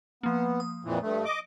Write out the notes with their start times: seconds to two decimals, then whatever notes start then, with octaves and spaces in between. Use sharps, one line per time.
0.23 F3 A#3 B3
0.60 D#6
0.85 F2 A#2 E3
1.02 G2 A3
1.25 D#5 D6